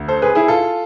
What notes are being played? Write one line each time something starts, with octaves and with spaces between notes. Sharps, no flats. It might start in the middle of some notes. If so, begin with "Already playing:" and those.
Already playing: D2
A4 C5
G#4 B4
E4 G#4
F4 A4